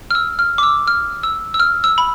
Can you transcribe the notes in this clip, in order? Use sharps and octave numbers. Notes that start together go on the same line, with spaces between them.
F6
E6
F6
D6
E6
F6
E6
E6
F6
E6
B5